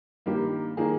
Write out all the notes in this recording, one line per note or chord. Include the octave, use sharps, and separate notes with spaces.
G2 D#3 A#3 G4
D#3 A#3 G#4